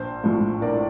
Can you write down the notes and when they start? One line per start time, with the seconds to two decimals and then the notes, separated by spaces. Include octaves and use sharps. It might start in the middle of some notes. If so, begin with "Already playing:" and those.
Already playing: A#1 C5
0.24 A2 F3
0.61 A#1 A#4 D5